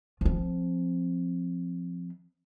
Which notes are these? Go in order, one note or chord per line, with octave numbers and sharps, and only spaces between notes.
F3 C4